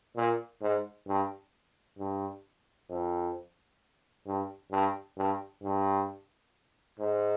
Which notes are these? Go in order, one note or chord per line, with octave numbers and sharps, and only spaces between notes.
A#2
G#2
G2
G2
F2
G2
G2
G2
G2
G#2